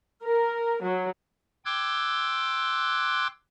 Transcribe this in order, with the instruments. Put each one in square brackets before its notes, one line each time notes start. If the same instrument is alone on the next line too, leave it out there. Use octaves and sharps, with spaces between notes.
[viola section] A#4
F#3
[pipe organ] G5 C6 D6 E6 F#6 G#6